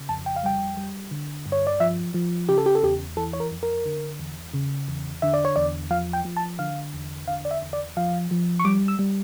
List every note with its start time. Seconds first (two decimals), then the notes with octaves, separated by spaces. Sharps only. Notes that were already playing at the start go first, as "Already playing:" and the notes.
Already playing: C#3
0.09 F2 A5
0.26 G5
0.36 F5
0.43 G3 G5
0.77 G3
1.11 D3
1.46 G2
1.52 C#5
1.67 D5
1.80 F3 E5
2.14 F3
2.49 C#3 G4
2.58 A4
2.66 G4
2.75 A4
2.83 E2 G4
3.17 E3 A4
3.33 C#5
3.40 A#4
3.51 F2
3.63 A#4
3.85 D3
4.19 E2
4.54 C#3
4.88 E2
5.22 D3 E5
5.34 D5
5.45 C#5
5.56 E2 D5
5.91 F3 F5
6.13 G5
6.25 F3
6.37 A5
6.59 D3 F5
6.94 E2
7.28 D3 F5
7.45 D5
7.51 E5
7.62 E2
7.73 D5
7.97 F3 F5
8.31 F3
8.59 C#6
8.65 G3 D6
8.88 E6
8.99 G3